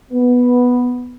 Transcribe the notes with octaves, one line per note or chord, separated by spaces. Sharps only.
B3